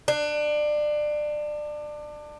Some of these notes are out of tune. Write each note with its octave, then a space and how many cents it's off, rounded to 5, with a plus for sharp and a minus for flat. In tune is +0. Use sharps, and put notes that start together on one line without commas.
D4 +25